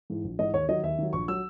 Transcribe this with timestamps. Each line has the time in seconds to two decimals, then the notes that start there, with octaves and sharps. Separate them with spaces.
0.10 G#2 E3
0.24 A#1
0.39 G#2 E3 D#5
0.53 D#2 C#5
0.69 D#3 F#3 D#5
0.83 D#2 E5
0.98 D#3 F#3
1.13 A#1 C#6
1.28 F#3 E6